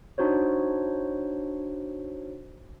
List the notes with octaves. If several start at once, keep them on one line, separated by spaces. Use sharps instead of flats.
D4 D#4 F#4 C5 C#5